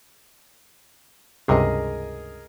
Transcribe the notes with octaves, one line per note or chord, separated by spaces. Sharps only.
C#2 G2 C3 G#4 A#4 D#5